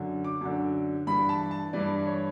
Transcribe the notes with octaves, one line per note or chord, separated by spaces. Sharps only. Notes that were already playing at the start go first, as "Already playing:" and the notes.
Already playing: F#2 D3
D6
F#2 D3
G2 E3 B5
A5
A5
G2 E3 D5
C#5